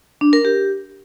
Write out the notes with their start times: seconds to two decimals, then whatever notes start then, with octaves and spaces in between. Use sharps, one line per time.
0.21 D4
0.33 A#4
0.45 G4